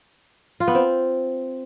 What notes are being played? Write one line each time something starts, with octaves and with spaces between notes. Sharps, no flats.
F4
B3
C4